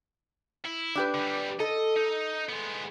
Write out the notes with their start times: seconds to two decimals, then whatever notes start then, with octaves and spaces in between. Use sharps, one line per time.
0.65 E4
0.95 D4 G4 B4
1.14 D3 G3
1.60 A4 D#5
1.96 D#4
2.49 G#3 B3